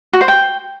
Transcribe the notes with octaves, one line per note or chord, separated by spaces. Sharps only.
F#4
C5
G5